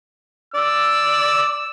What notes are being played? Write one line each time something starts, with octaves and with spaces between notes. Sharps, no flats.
D5 E6